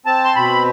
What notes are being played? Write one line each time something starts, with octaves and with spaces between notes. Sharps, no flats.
C4 A5
C6
B2 B5